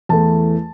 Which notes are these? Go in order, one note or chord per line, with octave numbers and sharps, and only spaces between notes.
E2 E3 A3 A5